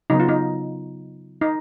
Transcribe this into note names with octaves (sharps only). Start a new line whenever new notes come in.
C#3 F#3 B3 D#4
F4
D#4
D#4